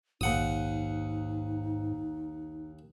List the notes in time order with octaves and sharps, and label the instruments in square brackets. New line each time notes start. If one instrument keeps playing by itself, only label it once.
[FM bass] A#1 [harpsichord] D#2 F#5 D#6 [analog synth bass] G#2 [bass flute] D#4